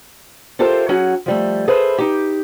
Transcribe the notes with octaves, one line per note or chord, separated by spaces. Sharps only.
F4 G4 A4 A#4 C5 E5
F#3 C#4 F#4 G#4
F3 G3 A3
G#4 A4 B4 C5 E5
D#4 G4